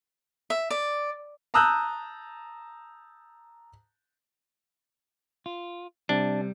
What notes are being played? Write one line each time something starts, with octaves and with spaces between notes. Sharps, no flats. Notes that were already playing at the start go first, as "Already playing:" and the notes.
E5
D5
A5 A#5 D#6 E6 F#6 G6
F4
C3 G3 D4